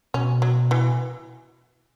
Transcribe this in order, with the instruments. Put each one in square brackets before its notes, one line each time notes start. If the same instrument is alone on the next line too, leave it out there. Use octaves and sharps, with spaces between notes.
[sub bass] B2 [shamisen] C#4
[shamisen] F#3
E3